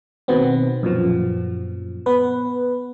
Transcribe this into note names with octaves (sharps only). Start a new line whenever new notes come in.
B2 D#3 B3 C4
F#2 A#2 F3
B3 B4